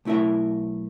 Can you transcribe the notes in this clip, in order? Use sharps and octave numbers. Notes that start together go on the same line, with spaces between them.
B1 A3 E4 A#4 E5